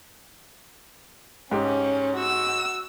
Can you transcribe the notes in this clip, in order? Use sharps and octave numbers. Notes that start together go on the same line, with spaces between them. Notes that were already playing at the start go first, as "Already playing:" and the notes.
G#2 C#4 G4
F#4 E6